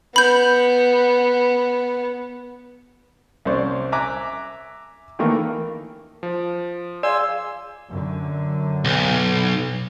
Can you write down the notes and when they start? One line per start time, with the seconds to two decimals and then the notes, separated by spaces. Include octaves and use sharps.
0.16 B3 B5 G6
3.45 C2 C#4 C5 D5
3.92 E5 G#5 A#5 D6 F#6
5.19 D#3 E3 A3 A#3
6.23 F3
7.03 G#4 D5 F5 G#5 C6 D6 E6
7.91 F#2 D3
8.85 B1